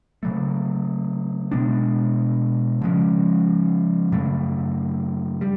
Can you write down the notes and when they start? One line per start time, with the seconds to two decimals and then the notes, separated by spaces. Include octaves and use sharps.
0.23 C#3 F#3 A3
1.51 B2 G#3 B3 D4
2.82 C#3 F3 G#3 C#4
4.12 F#2 C#3 F#3 A3
5.41 G3